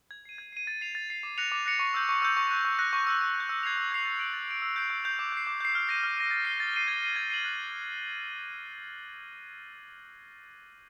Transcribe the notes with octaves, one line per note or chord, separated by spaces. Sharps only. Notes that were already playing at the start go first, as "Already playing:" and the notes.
G#6
C7 D#7
G#6
C7 D#7
A6
C7 F7
A6
C7 F7
D6
F#6 A#6 C#7 F7
D6
F#6 A#6 C#7 F7
C#6
E6 G6
C#6
E6 G6
C#6
F#6 A#6
C#6
F#6 A#6
C#6
E6 G6
C#6
E6 G6
E6
G#6 C7 F7
E6
G#6 C7 F7
A6
D7 F#7
A6
D7 F#7
E6
G6 C7 F7
E6
G6 C7 F7
D6
G6 C7
D6
G6 C7
F6
A#6 D#7
F6
A#6 D#7
A6
C7 D#7 G7
A6
C7 D#7 G7
G#6
C7 D#7 F#7
G#6
C7 D#7 F#7
F#6